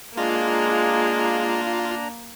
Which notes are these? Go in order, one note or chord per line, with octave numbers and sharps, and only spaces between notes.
G#3 A#3 D4 F4 A#5